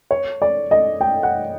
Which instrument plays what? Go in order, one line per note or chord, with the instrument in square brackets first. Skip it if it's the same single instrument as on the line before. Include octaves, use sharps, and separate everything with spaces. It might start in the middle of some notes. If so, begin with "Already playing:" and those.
[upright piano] C#5
D5
D#5
G5
F#5